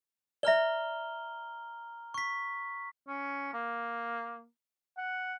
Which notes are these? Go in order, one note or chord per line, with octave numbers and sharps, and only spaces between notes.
D5 E5 A#5 F6 G7
C#6 B6
C#4
A#3
F#5